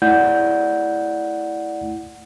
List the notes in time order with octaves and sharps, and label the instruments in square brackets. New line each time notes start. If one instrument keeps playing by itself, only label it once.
[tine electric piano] A3 E4 D5 F#5 G6